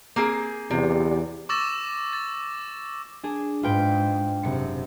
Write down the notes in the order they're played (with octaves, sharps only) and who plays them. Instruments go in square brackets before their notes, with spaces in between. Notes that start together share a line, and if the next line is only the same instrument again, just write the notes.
[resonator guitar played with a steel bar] A#3 C4 G#4
[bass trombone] E2 [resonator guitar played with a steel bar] C3 [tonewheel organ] G4 D5
[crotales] C#6 D6 E6 A6 A#6 E7
A6
[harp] D4 G#4
[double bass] G#2 [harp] F4 B4 G5
[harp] F#1 C#7 [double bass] C3